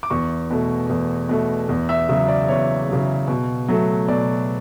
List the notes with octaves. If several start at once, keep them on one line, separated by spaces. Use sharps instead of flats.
D6
E2 C#6
B2 A3
E2
B2 A3
E2
E5
C#3 F#3 E5
D5
E2 C#5
C#3 F#3
B2
F#3 A3
B2 D5